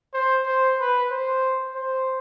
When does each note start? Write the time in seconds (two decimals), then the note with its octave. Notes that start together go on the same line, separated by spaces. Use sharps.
0.14 C5
0.46 C5
0.79 B4
1.11 C5
1.75 C5